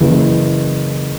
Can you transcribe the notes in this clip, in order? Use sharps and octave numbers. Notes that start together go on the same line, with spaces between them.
F#1 E3